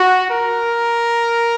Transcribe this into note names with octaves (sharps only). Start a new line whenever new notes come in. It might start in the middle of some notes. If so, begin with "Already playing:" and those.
Already playing: F#4
A#4